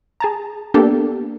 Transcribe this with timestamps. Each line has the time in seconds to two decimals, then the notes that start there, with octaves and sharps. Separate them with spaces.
0.20 G#4 A5 A#5
0.74 A#3 B3 D4 G4 A4